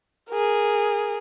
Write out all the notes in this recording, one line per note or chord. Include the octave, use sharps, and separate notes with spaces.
G#4 A#4